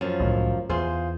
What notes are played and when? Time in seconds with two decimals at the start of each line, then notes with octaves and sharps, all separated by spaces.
0.01 F#2 F3
0.20 C2 A2 D#3
0.69 E2 F4 G#4 C5